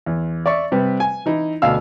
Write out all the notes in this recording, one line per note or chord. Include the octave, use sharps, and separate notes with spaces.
E2
D5 E5 C#6
C3 G3 B4
G#5
E3 D#4 E4
D2 B2 F5 E6